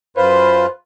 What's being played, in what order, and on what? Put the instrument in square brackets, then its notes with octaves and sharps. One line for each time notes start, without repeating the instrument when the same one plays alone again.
[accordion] F#2 F4 B4 [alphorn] C5